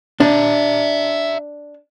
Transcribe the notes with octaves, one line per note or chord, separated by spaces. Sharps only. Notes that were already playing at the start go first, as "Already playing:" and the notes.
D4 E5 A#5